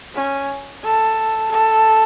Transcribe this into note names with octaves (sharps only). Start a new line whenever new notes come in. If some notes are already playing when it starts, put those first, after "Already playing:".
C#4
A4
A4